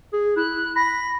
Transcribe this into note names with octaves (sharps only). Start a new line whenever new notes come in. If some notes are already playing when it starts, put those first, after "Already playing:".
G#4
E4 F#6
B5 A#6